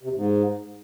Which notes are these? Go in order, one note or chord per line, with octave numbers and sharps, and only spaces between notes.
C3
E2
G#2